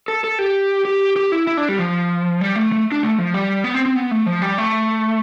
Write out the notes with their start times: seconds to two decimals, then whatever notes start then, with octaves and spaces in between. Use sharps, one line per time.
0.08 A4
0.24 A4
0.39 G4
0.85 G4
1.16 G4
1.32 E4
1.47 E4
1.57 D4
1.69 G3
1.79 F3
2.41 G3
2.56 A3
2.72 A3
2.92 D4
3.03 A3
3.18 F3
3.34 G3
3.64 B3
3.75 C4
3.86 C4
3.96 B3
4.11 A3
4.26 F3
4.42 G3
4.58 A3